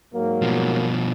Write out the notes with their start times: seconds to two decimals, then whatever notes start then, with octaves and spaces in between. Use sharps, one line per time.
0.12 G#2 F#3 A#3
0.42 B2 F3